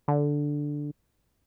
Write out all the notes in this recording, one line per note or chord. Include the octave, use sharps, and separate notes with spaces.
D3